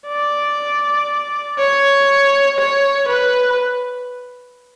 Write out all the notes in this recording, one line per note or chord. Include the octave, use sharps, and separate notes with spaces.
D5
C#5
C#5
B4